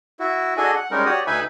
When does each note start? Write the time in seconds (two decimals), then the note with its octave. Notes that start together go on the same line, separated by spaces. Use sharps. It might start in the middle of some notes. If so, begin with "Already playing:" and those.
0.20 E4 F#4
0.57 D4 F#4 G#4 A4 D#5 G#5
0.75 F#5
0.91 G3 G#3 C#4 D#4 A#4
1.06 F#4 G4 C#5 D5 D#6
1.27 D2 D#4 B4 E5 G#5 B5